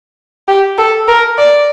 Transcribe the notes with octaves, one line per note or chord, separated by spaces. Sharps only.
G4
A4
A#4
D5